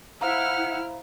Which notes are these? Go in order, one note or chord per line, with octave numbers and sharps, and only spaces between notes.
E4 C5 F5 F#5 A#5 F6